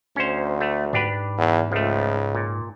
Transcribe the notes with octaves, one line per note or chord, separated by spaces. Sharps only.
D2 C#4 C5
A3
G#2 D4 G4 B4
E2
C#2 F3 A3
A#2